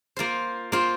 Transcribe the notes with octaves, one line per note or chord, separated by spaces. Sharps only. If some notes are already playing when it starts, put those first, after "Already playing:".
A#3 F4 C5
A#3 F4 C5